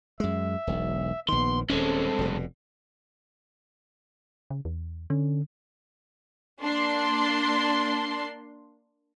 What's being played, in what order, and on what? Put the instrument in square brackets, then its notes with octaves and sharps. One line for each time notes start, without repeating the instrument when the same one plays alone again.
[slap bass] F#2 G#3 [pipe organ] E5
[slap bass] E1 B1
[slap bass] A#1 D#3 [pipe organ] B3 [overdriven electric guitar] C6
[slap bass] D#1 C#4 [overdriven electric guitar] G2 G#3 [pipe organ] C4 A4
[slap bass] F1 B2
[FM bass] C#3
E2
[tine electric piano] D3 [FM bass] C#4
[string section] A#3 D4 C6